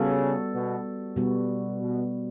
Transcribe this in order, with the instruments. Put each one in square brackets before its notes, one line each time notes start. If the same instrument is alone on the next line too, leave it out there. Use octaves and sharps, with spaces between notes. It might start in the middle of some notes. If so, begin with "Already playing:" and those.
Already playing: [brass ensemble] C#3 [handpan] G3 B3 F#4 A4
[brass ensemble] B2
[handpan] B2 G3 B3 F#4
[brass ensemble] B2